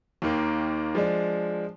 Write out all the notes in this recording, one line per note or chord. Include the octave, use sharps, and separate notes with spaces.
D#2 D#3 A#3
F3 G#3 D4